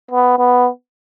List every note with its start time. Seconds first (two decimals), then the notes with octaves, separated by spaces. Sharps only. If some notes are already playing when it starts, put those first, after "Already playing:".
0.11 B3
0.39 B3